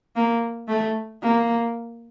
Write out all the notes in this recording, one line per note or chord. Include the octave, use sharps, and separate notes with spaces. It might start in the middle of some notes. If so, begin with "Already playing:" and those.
A#3
A3
A#3